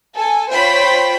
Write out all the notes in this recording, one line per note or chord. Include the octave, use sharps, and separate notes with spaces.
A4 G#5
F4 C5 C#5 G5 B5